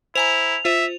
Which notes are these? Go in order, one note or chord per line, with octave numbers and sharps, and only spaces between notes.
E4 C5 G#5 A#5 F7
F4 C5 E5